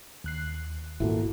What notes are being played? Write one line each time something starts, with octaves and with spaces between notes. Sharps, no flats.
D#2 F#6 C7
G#1 A#2 E4 F#4 A4